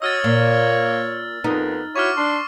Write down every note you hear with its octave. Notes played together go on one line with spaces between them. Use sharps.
F#4 C#5 D#5 E6 F6 A6
A#2 A#3
F2 B3 D#4 A#4
E4 F#4 C#5 C#6 D6 F6
D4 C6